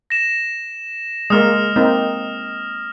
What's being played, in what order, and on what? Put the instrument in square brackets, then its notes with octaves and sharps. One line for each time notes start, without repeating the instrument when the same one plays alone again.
[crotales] A#6 E7
[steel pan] G#3 A#3 [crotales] D#6 F6
[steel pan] A#3 C4 D#4